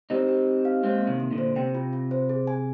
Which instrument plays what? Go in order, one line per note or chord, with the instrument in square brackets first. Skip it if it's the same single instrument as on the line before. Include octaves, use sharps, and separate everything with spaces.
[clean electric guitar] C4 D#4 [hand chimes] G4
[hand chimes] G4
G4
F5
[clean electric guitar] G#3 C4 [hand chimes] A#3
[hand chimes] A#3
[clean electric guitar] C3 D#3
[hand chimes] A#3
[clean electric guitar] A#2 D3
[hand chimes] C5
[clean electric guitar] C3 [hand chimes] G5
[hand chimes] F4
F4
C5
G#4
G#5